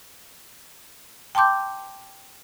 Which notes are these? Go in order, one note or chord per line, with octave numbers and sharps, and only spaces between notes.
G5 A5 C6 D6 G6